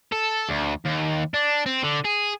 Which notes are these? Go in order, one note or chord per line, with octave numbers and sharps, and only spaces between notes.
A4
D2
D#2
D4
C4
D3
G#4